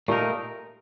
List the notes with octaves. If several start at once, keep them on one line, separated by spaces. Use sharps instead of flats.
A#2 A3 D#4 G4 A#4